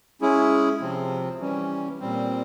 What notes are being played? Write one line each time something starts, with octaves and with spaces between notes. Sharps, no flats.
G#3 C#4 E4 G#4
C3 F3 C4
E3 G3 C#4
A#2 G3 C4